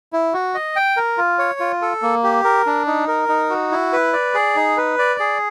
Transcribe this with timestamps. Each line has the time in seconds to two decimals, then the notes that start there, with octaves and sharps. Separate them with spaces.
0.13 E4
0.33 F#4
0.54 D#5
0.76 G5
0.97 A#4
1.18 F4
1.39 C#5
1.60 F4
1.82 A4
2.02 A#3
2.23 G4
2.44 A#4
2.66 D4
2.87 D#4
3.08 A#4
3.29 D#4
3.50 F#4
3.71 E4
3.93 B4
4.13 D5
4.34 G#4
4.56 D#4
4.77 B4
4.99 D5
5.20 G#4